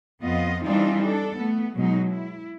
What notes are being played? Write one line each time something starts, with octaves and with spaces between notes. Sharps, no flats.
F2 B3 F4 D#5
E3 G3 C4 D4 D#4 F4
D4 A4
A3 B3
B2 F#3 G#3 D#4
E4